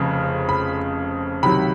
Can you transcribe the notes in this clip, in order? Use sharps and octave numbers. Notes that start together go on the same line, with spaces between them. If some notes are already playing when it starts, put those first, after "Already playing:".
Already playing: F1 F2 C#3 F3
B5
C#2 C3 D#3 F#3 B5